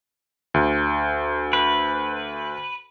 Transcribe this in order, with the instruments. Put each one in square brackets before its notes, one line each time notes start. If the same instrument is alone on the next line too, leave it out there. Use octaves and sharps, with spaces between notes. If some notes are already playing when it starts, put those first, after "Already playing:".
[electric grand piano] D2
[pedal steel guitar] B4